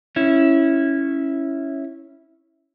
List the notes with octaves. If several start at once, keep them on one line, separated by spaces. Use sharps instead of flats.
C#4 E4